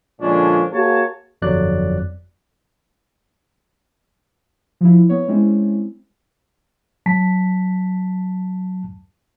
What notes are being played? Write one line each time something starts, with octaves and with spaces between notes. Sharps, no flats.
A#2 D3 F3 G#3 C#4 D4
A#3 F#4 G#4 C#5 A5
G1 F2 F#3 D5 F#6
F3 E4
B3 C#5
G#3 C4 C#4 E4
F#3 A5 B6